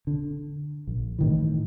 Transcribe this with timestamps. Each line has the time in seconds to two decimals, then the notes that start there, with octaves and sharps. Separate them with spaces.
0.07 D3
0.87 A#1
1.19 A2 D#3 E3